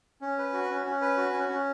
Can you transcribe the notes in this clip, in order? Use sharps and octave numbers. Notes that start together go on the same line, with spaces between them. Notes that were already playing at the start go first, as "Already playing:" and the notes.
C#4
B4
F#4
C#4
C#4
B4
F#4
C#4
C#4